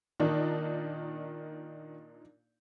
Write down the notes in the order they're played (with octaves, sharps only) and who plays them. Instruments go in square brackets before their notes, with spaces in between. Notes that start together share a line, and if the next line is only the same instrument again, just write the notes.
[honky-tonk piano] A#2 D4 D#4 [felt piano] D#3